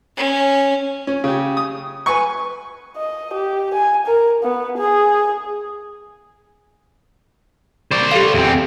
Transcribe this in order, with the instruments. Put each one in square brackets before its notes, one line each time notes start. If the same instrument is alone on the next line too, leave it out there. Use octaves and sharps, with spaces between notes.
[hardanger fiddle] C#4
[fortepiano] C#4
C#3 G4
D#6
B4 G#5 C#6
[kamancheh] D#5
G4
G#5
A#4
B3
G#4
[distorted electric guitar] C5 D5
[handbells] G4 A4 F5
[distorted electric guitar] E2 C4